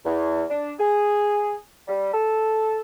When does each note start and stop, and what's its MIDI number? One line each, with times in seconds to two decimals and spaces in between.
0.05 0.43 40
0.50 0.72 62
0.79 1.57 68
1.88 2.14 55
2.14 2.81 69